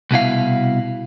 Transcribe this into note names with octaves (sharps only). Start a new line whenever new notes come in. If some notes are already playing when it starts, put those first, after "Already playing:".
C2 B2 E4 F5